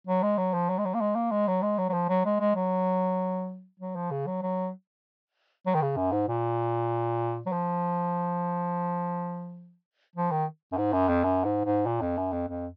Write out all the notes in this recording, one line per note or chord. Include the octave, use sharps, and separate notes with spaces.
F#3
G#3
F#3
F3
F#3
G#3
F#3
A#3
G#3
A#3
G#3
F#3
G#3
F#3
F#3
F3
F#3
G#3
G#3
F#3
F#3
F3
C#3
F#3
F#3
F#3
D#3
C#3
F#2
G#2
A#2
F#3
F3
F3
D#3
F#2
G#2
F#2
F2
F#2
G#2
G#2
A#2
F2
F#2
F2
F2